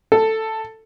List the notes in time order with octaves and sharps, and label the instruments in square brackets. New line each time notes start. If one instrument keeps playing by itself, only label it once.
[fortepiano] A4